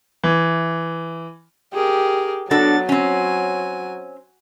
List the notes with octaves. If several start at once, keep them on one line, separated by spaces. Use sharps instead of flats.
E3
G4 G#4 A#4
F#3 B3 D4 F#4 A4 A6
C4 C#4 G#5